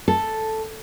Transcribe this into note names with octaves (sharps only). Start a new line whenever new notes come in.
A4